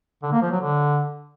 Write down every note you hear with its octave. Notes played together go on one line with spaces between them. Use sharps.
D3
A#3
F3
F#3
D3